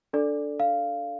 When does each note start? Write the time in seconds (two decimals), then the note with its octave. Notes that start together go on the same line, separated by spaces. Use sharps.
0.13 D4 A4 D5
0.60 F5